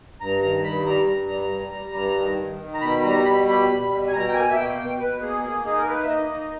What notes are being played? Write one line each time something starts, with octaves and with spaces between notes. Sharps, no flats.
G2 A#5
D#3 A#5
G2 B5
G3 A#5
G2
G3
G3
G3
G2
D#3
D#3
D#3
A#5
B2 B5
B5
G3 A#5
B2 B5
G3 B5
G3
B2
G#5
B2 A#5
G5
A#3 G#5
E5
B2 G5
B2 G5
B2 B4
A#3 G#4
A#3 G#4
D#4 G#4
A#4
A#3 B4
E5
A#3 D#5
D#4